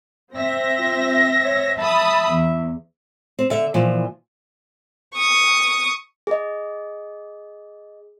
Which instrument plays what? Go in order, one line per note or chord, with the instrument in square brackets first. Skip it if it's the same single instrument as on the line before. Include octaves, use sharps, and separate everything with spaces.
[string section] C4 E5 A#6
[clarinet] F4
C#5
[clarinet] E5 [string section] A5 B5 D#6
[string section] E2
[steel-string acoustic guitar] C4
D3 E5
A#2 E3 F3
[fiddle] C#6 D#6
[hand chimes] G#4 D#5